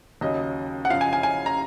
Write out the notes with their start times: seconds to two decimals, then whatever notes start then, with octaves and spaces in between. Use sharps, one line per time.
0.21 D#2 C#3 F#3 D#5
0.85 F#5
0.90 F#2 C#3 F3 F5
1.01 G#5
1.13 G#5
1.23 G#5
1.46 A#5